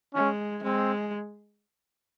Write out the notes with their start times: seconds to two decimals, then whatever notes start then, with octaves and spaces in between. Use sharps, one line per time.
0.15 G#3 C#4
0.63 G#3 C4